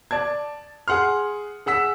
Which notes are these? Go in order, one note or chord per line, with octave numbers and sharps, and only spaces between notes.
D5 A5 G#6
G#4 F#5 C6 F6
G#4 F#5 E6 B6 E7